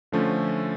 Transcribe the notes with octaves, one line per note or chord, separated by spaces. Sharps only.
D3 F3 A3 C#4